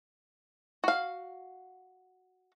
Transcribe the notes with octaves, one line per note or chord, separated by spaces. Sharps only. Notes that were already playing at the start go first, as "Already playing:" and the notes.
F#4 F5